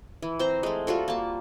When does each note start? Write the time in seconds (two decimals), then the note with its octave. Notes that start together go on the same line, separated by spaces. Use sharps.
0.22 E3
0.39 C4 C5 A#5
0.63 G#3 A3
0.87 G3 F4 F#4 A4
1.08 A#3 A5